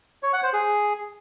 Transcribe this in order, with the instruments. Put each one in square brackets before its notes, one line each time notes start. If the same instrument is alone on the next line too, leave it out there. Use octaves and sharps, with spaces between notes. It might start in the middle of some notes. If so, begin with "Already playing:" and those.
[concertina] C#5
F#5
C5
G#4